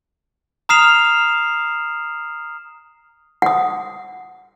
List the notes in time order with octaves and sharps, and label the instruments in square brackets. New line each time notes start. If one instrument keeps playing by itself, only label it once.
[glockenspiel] A#5 D#6 F6 C7 E7 F7
[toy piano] F#5 D#6